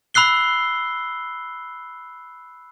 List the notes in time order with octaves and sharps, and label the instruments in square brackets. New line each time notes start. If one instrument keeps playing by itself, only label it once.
[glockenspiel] B5 E6 F#6 C7 G7